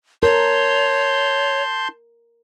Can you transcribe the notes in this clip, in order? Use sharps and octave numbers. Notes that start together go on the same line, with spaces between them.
A#4 C#5 A5 C6 G6